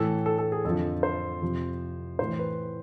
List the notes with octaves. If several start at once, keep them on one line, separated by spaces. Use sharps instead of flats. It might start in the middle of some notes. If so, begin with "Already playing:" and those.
Already playing: A2 E3 A4
A4
A4
G#4
F2 D3 F3 A4
C5
F2 C3 F3
A2 E3 C5
B4